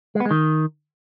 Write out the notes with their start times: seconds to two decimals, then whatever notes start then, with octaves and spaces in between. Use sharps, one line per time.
0.15 G#3
0.20 B3
0.25 G#3
0.31 D#3